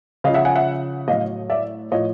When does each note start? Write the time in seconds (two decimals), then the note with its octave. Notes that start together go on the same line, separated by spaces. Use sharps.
0.24 C#3 D#5 F5
0.29 F3
0.34 E5 F#5
0.45 F#5 G#5
0.55 E5 F#5
1.08 A2 F#3 D#5 F5
1.50 D5 E5
1.92 A2 F3 C#5 D#5